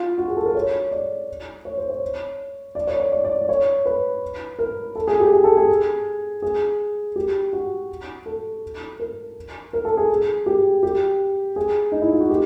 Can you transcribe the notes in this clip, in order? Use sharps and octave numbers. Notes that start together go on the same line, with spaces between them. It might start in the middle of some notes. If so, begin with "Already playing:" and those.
Already playing: F4
F#4
G#4
A4
A#4
C#5
D5
C#5
C5
C#5
D5
C#5
C#5
D5
D5
D5
C#5
B4
A#4
A4
G#4
G4
G#4
A4
G#4
G#4
G4
F#4
A4
A#4
A#4
A4
G#4
G#4
G4
G4
G#4
D#4
E4
F4
F#4
G4